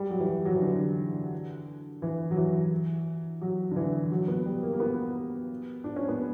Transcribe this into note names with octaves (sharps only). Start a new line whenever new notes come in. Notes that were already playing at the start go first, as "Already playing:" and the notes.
Already playing: G3
F#3
E3
F#3
F#3
E3
D3
E3
F#3
E3
F#3
D3
E3
F#3
B3
G3
A#3
A#3
B3
D4
C#4
B3